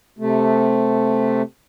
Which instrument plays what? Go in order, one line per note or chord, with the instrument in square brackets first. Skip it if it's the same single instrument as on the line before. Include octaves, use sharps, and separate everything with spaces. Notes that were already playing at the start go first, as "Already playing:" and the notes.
[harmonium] C3 A3